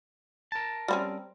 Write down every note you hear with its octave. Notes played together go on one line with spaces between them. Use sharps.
A#4 A5
G3 C4 C#4